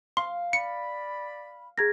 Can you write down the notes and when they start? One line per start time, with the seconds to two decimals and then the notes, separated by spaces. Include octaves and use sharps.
0.17 F5 C6
0.53 D5 B5 C#7
1.78 G#4 A#4 G#6 A#6